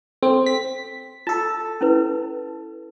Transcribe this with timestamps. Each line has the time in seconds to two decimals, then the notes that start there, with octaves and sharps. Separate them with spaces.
0.23 C4 A4
0.46 B6
1.27 F4 A4 A5
1.81 C#4 E4 B4